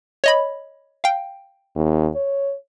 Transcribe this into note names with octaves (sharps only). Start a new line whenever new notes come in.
C#5 D#5 B5
F5 G5
D#2
C#5